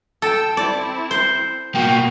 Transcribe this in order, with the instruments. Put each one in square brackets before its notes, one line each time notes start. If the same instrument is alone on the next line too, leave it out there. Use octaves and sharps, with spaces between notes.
[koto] A4 [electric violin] G5 E6
[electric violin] C4 E4 [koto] D5
[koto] C5
[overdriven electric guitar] B2 A#3 [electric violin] F#4 [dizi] G5